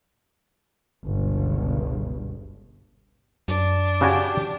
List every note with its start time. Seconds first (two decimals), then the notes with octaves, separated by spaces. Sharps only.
1.05 G1 C#2 G2 B2
3.48 F#2 D4
4.01 C#3 F#4 G4 G#5